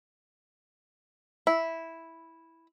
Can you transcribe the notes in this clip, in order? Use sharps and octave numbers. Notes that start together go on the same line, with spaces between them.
E4